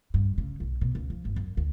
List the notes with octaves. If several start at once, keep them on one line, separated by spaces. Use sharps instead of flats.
G2
C#3
B1
B2
C#2
F3
G1
F#2
D2